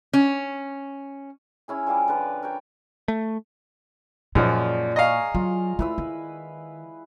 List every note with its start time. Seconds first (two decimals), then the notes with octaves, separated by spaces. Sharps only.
0.13 C#4
1.68 C#4 E4 G#4
1.87 F3 G3 F5 D6
2.08 D3 F4 B4
2.43 A#4 C#5 G5
3.08 A3
4.35 F#2 A#2 F3 G#3 D5
4.96 D#5 F5 G#5 A#5 C#6
5.35 F#3 F4
5.79 A3 E4 B4 E6
5.98 D#3